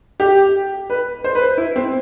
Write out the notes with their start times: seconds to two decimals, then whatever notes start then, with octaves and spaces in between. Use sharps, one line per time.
0.20 G4
0.90 B4
1.24 C5
1.35 B4
1.57 E4
1.76 C4